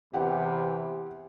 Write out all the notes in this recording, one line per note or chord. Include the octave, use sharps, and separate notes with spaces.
E2 C3 E3 G4 F#5 G5